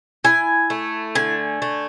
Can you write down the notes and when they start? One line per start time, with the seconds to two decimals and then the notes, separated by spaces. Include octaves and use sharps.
0.24 E4 G#5
0.70 A3
1.15 D3 G#5
1.62 A3